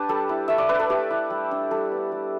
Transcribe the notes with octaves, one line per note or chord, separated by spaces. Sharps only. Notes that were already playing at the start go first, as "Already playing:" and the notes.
Already playing: D4 G4 B4 G5 A5
G3 A4
E4
A3 E5
D5
D4 B4
A4
A3 G4
E4
G3
D4
G3 A4
B3 D4
G3